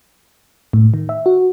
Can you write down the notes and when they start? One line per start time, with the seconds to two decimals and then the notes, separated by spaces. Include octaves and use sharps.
0.73 A2
0.94 D#3
1.09 E5
1.26 F#4